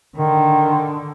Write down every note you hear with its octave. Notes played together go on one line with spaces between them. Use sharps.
D3 D#3